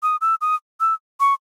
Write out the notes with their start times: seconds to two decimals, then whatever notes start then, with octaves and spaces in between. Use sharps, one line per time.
0.03 D#6
0.21 E6
0.41 D#6
0.80 E6
1.20 C#6